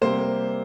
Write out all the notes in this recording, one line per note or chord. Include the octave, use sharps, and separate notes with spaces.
C3 G3 A#3 C5